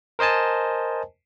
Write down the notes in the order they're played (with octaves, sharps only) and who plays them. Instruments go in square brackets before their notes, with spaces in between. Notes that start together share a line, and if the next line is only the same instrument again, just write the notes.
[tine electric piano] A#4 C5 D#5 G#5 A5